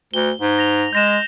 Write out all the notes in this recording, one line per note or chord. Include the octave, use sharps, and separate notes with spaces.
D2 G7
G#2
A#6 F7
G#3 G6 A#6 E7